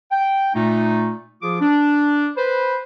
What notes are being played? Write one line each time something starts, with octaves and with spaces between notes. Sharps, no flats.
G5
A#2 A3 D#4
F3 F4 G#4 D6
D4
B4 C5